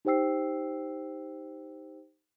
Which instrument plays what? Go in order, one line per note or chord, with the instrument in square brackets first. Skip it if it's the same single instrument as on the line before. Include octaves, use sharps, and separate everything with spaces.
[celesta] D#4 G4 C5 G5 E6 C7